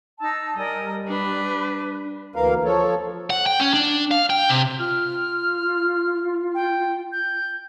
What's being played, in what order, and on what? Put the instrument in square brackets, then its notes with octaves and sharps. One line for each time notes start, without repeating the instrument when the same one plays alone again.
[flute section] D#4 A5 E6
[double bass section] G3 [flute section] A#4 D5 G#5 [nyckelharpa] D#5
[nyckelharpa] D4 [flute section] B4
[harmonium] D2 E3 A#3 A#4 F5
F3 A4 C#5
[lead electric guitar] F#5
G5
C#4
D4
F5
G5
C3
[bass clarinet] F4 [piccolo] F6
[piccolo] G5
G6